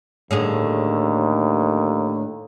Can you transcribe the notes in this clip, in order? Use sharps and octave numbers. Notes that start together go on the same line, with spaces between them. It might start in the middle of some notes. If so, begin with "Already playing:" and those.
D#2 A2 D3 G#4